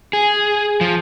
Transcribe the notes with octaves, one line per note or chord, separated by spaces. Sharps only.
G#4
F3